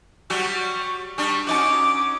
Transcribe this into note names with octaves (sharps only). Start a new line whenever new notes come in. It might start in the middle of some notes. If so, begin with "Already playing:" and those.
F#3 G3 F#4 C#6
G3 D4 C#6
C#4 D#4 F#4 D6